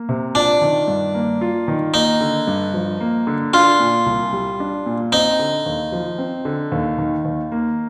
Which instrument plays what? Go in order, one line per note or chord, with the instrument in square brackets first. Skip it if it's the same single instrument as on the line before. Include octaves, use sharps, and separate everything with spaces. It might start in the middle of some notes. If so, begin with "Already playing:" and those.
Already playing: [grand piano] A#3
C3
[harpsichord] D4 [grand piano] F4
[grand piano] D#3
G2
A#3
F4
D#3
[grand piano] A#3 [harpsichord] D#4
[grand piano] D3
G2
F3
A#3
D3
[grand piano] D4 [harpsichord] F4
[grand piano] A#2
C2
G3
D4
A#2
[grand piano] C4 [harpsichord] D#4
[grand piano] D3
D#2
F3
C4
D3
D#2
D#3
D#2
A#3